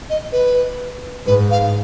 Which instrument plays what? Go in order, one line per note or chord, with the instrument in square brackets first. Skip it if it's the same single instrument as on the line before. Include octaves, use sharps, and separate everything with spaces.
[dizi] D#5
B4
[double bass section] G#2 [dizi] B4
[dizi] F5